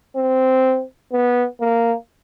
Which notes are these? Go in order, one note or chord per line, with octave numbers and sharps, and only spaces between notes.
C4
B3
A#3